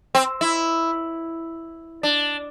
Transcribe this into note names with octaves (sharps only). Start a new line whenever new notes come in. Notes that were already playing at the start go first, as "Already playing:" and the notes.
C4
E4
D4